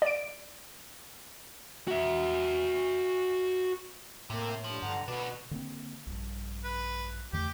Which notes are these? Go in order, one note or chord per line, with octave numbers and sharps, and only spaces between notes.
D5 D7
F#4 E5
A2 C3 A#3
G2 F3
G2 D3 F#5 A#5
B2 D4 F#4 B4
D3 A#3 C4
A#1 G2
B4
E2 D3 A3 G4